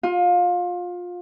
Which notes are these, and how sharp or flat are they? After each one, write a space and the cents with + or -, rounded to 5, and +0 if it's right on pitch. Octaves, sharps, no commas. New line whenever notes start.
F4 +25